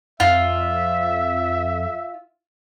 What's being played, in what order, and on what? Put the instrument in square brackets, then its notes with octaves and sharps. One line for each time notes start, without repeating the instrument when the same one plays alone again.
[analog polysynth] F2 [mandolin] F4 [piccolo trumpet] E5